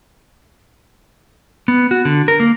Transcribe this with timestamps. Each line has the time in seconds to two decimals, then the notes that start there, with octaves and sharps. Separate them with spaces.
1.68 B3
1.91 F#4
2.05 D3
2.28 A#4
2.40 A#3